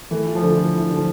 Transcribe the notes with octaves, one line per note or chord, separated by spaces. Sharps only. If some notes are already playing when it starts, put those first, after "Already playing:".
E3 A3
E4
F3
D3
D3
E4
D3
F3